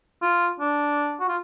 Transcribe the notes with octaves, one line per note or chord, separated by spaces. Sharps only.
F4
D4
F#4
F4